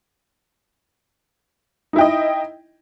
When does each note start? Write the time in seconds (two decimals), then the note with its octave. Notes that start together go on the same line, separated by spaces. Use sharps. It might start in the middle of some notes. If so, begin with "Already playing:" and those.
1.93 D#4
1.96 E4
1.98 G5
2.01 D#5